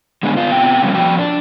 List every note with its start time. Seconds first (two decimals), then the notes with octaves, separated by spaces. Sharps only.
0.23 D3 G3 G#3 B3 D4 G#4
0.37 B3 F4
0.52 B2 C4 G5
0.82 C#3 F3 G3 A#3 C#4
0.94 F3 F#4 G5
1.18 D4